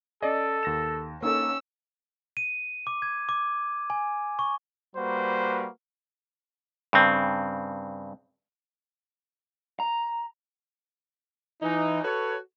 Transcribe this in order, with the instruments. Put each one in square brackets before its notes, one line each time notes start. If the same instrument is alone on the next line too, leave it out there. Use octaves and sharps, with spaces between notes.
[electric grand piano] C#4 D5 D#5 [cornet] A4
[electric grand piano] D#2 A#6 E7
[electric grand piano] A#3 D#4 A4 [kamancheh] C#4 E6
[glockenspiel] D#7
D6
G#6
D6
G#5
C#6
[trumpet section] G3 A#3 F#4 B4 C5
[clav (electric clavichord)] G2 C#3 C4
[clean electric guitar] A#5
[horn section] E3 D#4
F#4 A4 B4 C#5